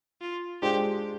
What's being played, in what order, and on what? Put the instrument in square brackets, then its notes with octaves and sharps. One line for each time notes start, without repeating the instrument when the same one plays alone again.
[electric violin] F4
[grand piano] G#3 D4 F4 C5 [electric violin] G4